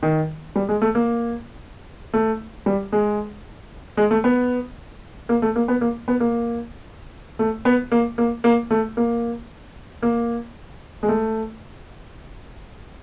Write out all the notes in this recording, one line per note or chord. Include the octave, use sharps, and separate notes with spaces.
D#3
G3
G#3
A3
A#3
A3
G3
G#3
G#3
A3
B3
A#3
A3
A#3
B3
A#3
B3
A#3
A3
B3
A#3
A#3
A#3
A3
A#3
A#3
G#3
A3